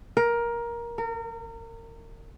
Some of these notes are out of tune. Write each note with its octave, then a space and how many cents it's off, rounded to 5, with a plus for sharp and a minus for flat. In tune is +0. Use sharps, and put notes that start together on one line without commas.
A#4 +15
A#4 -30